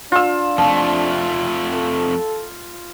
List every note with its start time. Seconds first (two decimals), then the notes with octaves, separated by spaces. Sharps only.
0.12 D4 F4 E6
0.58 F2 F3 A3
1.73 A4